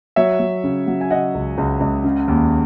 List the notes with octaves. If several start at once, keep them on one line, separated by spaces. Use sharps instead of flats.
F#3 C#5 E5
F#3
C#3
F#3
G#5
C#3 D#5 F#5
C#2
C#2
C#2
C#3
D#2